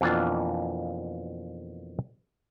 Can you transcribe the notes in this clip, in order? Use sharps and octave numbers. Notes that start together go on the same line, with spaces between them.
F2 B2 E3 A#3 D4 F4